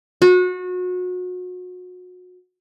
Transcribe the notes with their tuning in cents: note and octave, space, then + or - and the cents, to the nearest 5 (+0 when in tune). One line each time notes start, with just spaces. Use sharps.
F#4 -30